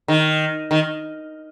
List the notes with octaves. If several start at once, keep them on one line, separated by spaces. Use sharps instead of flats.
D#3
D#3